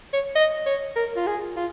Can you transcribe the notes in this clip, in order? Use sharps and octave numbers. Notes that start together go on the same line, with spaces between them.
C#5
D#5
C#5
A#4
F4
G#4
F4